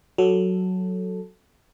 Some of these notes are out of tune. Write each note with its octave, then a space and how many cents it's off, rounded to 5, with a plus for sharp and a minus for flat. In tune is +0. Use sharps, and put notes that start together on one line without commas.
F#3 +0 A4 +0